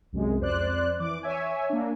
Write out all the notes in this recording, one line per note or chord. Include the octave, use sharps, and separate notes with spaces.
C2 F#2 C3 G#3
F2 C5 D5 F#6
E3 D6
C#5 E5 G#5
A#3 D4